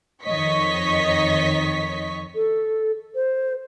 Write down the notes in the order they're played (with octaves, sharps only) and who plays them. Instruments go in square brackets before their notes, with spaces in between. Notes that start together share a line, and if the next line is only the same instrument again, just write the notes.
[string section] F2 D#3 C#5 D#5 C#6 B6
[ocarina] A4
C5